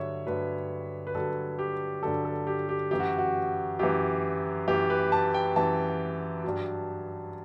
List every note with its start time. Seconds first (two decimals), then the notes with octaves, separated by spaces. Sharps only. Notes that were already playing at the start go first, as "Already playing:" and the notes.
Already playing: G2 D3 F#3 C#5 E5
0.26 G2 D3 F#3 B4
1.07 B4
1.14 G2 D3 F#3 A4
1.59 G4
2.03 G2 D3 F#3 A4
2.25 A4
2.47 G4
2.69 G4
2.91 F#2 E3 G4
3.00 F#4
3.18 F#4
3.79 F#2 E3 G4
4.67 F#2 E3 G4
4.90 B4
5.12 A5
5.34 G5
5.56 F#2 E3 A5
6.44 G2 F#3